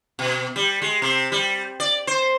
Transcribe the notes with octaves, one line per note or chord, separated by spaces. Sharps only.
B2
G3
G#3
C3
G3
D5
C5